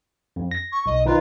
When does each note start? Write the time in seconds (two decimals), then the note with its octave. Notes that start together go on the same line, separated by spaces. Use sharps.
0.36 F2
0.51 A#6
0.71 C#6
0.86 B1 D#5
1.06 D#3 D#4 F4 B4